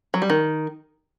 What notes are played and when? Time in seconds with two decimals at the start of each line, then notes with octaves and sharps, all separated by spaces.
0.14 F#3
0.22 G3
0.30 D#3